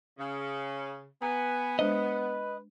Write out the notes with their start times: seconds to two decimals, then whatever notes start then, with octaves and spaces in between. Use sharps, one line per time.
0.18 C#3
1.22 B3 G#5 A#5
1.79 G#3 D4 B4 C5 D#5